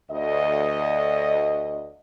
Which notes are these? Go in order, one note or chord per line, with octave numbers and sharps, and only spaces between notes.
D2 D#5